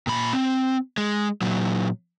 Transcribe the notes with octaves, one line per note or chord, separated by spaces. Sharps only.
A#2 B5
C4
G#3
A#2 F#3